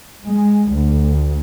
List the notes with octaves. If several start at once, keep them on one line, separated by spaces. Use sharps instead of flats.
G#3
D2